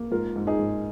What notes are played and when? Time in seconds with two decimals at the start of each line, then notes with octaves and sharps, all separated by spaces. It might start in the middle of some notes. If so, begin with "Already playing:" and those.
Already playing: A#3
0.11 G#2 F4 A#4
0.36 G#2
0.47 D#4 G#4
0.59 G#2